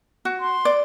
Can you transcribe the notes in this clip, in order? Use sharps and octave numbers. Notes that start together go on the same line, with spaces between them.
F#4
C6
D5